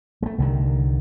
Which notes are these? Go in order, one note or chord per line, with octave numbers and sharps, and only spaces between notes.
G#3 A3
C2 D3 D#3